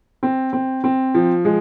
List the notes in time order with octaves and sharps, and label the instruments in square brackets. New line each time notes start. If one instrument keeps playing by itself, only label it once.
[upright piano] C4
C4
C4
F3
G#3